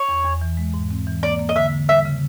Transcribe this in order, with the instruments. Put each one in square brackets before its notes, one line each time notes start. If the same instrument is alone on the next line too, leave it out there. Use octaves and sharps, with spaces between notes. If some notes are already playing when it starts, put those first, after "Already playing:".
Already playing: [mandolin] C#5
[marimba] E2
E2
E3
G#3
G#2
C4
E3
[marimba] A#3 [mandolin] D5
[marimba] A#3
[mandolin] D#5
[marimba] D3 [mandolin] E5
[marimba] D3
[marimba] G3 [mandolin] E5
[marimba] C#3